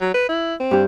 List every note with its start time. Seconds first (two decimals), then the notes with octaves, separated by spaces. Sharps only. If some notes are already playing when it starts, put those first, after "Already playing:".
0.01 F#3
0.14 B4
0.29 E4
0.60 C4
0.71 G2 G4